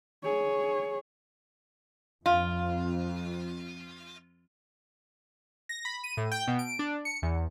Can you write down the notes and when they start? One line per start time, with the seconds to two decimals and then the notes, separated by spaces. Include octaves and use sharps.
0.23 G#4 C#5
2.26 F2 F4 F5
5.69 A#6
5.85 B5
6.04 D#7
6.17 A2
6.32 G5
6.48 B2
6.59 D7
6.79 D4
7.05 C#7
7.22 E2